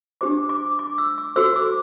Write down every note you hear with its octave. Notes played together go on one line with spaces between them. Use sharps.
D4 G4 C5 D6
D6
D6
E6
D6
F#4 A4 C5 E6
D6